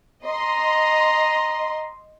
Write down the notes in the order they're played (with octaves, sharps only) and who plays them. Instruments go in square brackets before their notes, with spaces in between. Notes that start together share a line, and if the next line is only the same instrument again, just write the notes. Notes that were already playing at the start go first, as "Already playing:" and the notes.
[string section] D#5 C6 [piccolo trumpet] A#5